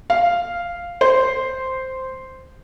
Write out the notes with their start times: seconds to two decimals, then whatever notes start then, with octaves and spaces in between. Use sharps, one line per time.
0.10 F5
1.01 C5